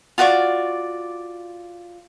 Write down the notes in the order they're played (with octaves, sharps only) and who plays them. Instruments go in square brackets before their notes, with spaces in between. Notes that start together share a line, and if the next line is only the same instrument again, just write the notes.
[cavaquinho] F4 F#4 D5 C#6